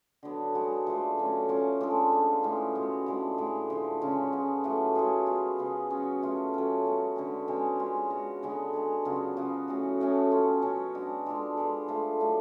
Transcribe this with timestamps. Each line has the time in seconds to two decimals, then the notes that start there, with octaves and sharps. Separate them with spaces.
0.23 D3 F#3 B3 D4
0.54 B2 G#3 D4 F#4
0.87 F3 A3 D4
1.17 D3 F#3 A3 C#4
1.49 F3 A3 C#4
1.81 G#3 D4 F4 A4
2.12 F3 B3 D4
2.43 A2 G#3 C#4
2.75 B2 G#3 B3 F#4
3.06 A2 F3 G#3 D4
3.38 A2 G#3 B3
3.70 D3 F3 A3
4.01 C#3 G#3 C#4
4.32 G#3 B3 F4 A4
4.64 A2 F#3 A3 F4
4.95 F#3 A3 F4 G#4
5.27 F3 G#3 B3 F4
5.58 C#3 F3 B3
5.90 F#3 C#4 F#4
6.22 B2 A3 F4
6.54 F#3 C#4 F4 A4
6.85 G#3 B3 F#4
7.16 D3 G#3 C#4
7.48 B2 G#3 C#4 G#4
7.79 G#3 C#4 F4
8.10 G#3 B3 F#4
8.43 D3 G#3 B3 F#4
8.73 G#3 D4 G#4
9.05 C#3 F#3 B3 F4
9.37 C#3 F3 B3 F#4
9.68 A2 F#3 C#4 F#4
10.00 A2 F#3 A3 C#4
10.31 G#3 C#4 F4 A4
10.62 B2 F#3 C#4
10.95 G#3 D4 F#4
11.26 G#3 D4 F4 A4
11.57 F3 G#3 B3 D4
11.88 F3 A3 F4 A4
12.20 A2 F#3 A3 D4